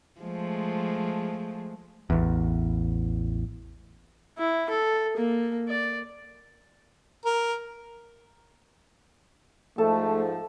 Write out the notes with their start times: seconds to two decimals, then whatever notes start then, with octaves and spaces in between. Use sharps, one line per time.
0.21 F3 G#3 A3
2.10 A1 E2
4.38 E4
4.69 A4
5.17 A#3
5.68 D5
7.26 A#4
9.78 G#2 F3 A3 A4